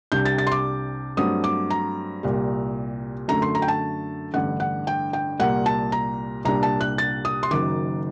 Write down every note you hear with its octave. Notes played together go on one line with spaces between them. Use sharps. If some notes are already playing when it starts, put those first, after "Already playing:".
C2 C3 G3 D4 G6
A6
A6
C6
D6
G2 F#3 A3 C4 D#6
D6
A#5
C2 A#2 G3
F#2 D3 A3 A#5
C6
A#5
G5
A5
A1 G2 D3 F#5
F#5
G5
G5
C2 A#2 G3 A#3 F#5
A5
A#5
C2 A#2 G3 D4 A#5
A5
F#6
A6
D#6
C6
F#1 F#2 D#3 D6